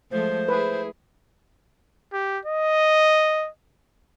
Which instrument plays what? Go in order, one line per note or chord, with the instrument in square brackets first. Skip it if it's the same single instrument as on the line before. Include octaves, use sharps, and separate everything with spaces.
[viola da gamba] F3 G#3 A3 [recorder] C5
[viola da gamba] E4 G#4 [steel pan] B4
[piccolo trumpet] G4
D#5